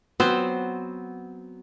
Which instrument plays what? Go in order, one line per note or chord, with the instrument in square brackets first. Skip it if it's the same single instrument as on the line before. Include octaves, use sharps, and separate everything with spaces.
[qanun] F#3 [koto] B3 C4 C5